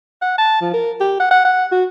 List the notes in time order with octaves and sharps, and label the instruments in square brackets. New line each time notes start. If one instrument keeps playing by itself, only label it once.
[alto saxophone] F#5
A5
F3
A#4
G4
F#5
F#5
F#5
F#4